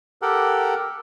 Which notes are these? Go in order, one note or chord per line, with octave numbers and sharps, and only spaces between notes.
G4 A4 A#4 F#5